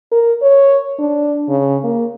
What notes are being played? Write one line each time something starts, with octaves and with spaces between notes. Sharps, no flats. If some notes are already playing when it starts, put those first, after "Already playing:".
A#4
C#5
D4
C#3
A#3